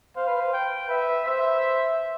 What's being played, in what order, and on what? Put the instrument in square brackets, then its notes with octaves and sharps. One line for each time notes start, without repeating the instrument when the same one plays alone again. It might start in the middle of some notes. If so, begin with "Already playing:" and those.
[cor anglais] C5 [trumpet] F5
[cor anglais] B4
C5
[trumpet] G5
[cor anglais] B4 [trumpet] E5
[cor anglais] C5 [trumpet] E5